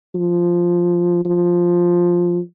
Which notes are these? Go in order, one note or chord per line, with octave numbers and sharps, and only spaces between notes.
F3
F3